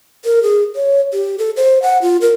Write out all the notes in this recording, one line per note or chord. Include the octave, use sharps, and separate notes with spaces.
A#4
G#4
C#5
G4
A4
C5
F#5
F4
A#4